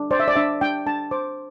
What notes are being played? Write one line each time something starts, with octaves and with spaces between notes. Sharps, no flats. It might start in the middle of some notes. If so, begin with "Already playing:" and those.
Already playing: D4
C5 D5
E5
D5
D4 E5
D4 G5
D4 A5
C5 D6